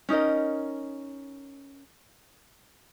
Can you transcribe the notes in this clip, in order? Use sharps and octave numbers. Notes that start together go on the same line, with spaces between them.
C#4 D#4 A#4 D#5